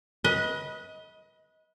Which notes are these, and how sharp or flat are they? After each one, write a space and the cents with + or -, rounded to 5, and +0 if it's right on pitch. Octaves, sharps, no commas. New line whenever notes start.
B4 -20 D#5 +20